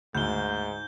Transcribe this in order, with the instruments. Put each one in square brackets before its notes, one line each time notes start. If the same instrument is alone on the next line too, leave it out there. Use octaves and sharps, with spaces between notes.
[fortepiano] D2 [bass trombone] G#2 [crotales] G6 G7